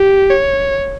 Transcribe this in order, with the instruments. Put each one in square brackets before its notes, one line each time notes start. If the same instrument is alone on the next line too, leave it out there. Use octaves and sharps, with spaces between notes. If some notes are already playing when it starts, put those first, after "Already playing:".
Already playing: [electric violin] G4
C#5